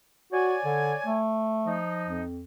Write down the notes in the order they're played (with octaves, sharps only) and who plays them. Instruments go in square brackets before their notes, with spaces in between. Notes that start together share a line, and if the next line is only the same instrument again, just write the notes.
[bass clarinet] F#4 [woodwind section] C#5 D5 G#5
[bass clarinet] D3
A3
[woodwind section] F3 D#4
[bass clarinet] F2